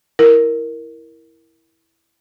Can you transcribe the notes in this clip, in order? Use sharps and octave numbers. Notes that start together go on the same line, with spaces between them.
E4 A#4